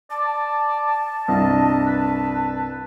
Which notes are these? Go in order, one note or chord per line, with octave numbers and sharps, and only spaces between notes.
D5 A5
C2 G2 D#5
B4